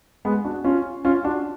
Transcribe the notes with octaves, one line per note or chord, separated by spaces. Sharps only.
G#3 B3
D4 F#4
C#4 F4
C#4 F4
D4 F#4